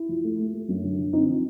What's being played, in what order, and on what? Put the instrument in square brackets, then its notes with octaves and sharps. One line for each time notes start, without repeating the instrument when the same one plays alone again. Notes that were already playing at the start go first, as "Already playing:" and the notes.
Already playing: [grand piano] E4
F3
A3
A3
A3
F#2
D3
D3
C4 D#4
F3